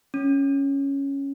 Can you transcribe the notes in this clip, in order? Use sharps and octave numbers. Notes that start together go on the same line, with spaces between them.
C#4